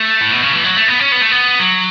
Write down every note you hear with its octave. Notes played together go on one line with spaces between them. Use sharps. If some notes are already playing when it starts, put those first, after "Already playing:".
Already playing: A3
A2
B2
C#3
E3
F#3
A3
B3
C#4
B3
A3
B3
F#3